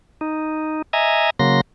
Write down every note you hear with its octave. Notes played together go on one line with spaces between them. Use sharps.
D#4
D#5 E5 G#5 A#5
C#3 F#3 A#3 C6 A#6